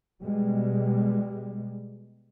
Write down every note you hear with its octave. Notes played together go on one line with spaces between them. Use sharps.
B2 G3 G#3